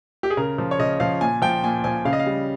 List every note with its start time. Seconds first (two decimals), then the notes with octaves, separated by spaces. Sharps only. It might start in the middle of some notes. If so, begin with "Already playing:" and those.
0.23 G4
0.30 G#4
0.37 C#3 A#4
0.58 F3
0.71 C#5
0.79 C#3 D#5
1.00 F3 F5
1.21 A#2 G#5
1.42 F3 G5
1.64 A#2 G#5
1.84 F3 G#5
2.05 C#3 F5
2.13 D#5
2.19 F5
2.26 G3